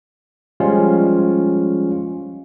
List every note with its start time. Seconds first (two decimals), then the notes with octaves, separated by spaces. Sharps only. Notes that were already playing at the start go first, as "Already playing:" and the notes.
0.60 F3 G3 G#3 C#4 F4